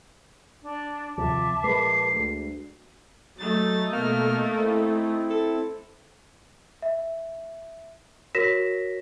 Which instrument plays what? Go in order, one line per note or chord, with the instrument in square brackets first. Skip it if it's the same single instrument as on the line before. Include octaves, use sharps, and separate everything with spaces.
[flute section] D4
[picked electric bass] D#2 C3 F3 [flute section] E5 A5 D6
[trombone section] A#1 A#4 B4 [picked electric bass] G#3 [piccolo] C7
[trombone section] D2
[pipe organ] F#3 A6 [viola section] A3 D#4
[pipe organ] B2 F6 [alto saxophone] A#3
[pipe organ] C4 E4
[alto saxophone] A4
[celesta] E5
F#4 A#4 C#5 A#6 B6 E7